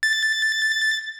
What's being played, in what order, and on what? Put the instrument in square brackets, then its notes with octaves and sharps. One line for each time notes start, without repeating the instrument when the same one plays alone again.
[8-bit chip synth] A6